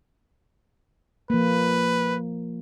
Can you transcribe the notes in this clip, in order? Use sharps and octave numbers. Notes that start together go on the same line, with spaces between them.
F3 A#3 B4